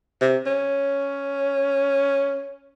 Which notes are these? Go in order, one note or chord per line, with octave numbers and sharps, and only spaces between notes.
C3
C#4